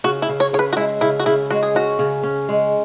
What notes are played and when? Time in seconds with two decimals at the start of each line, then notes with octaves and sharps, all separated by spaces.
0.04 C#3 F#4
0.22 E4
0.29 C#3
0.40 C#5
0.53 C#3 C#5
0.59 B4
0.73 F#4
0.77 G#3 E4
1.01 C#3 E4
1.20 F#4
1.26 C#3 E4
1.51 G#3 F#4
1.63 G#4
1.75 C#4 F#4
1.99 C#3
2.23 C#4
2.49 G#3